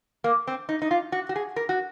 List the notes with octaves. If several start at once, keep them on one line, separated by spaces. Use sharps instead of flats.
A#3
C4
D#4
D#4
F4
F#4
F#4
G#4
A#4
F#4